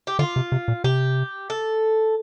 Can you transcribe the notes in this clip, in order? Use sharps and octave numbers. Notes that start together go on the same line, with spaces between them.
G4
D3 F4
C3
C3
A#2
C3 G4
A4